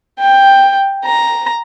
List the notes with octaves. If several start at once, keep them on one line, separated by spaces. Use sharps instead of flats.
G5
A#5